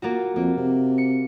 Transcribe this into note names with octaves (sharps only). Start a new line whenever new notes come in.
A#3 F4 F#4
F2 A#3
C3
C#7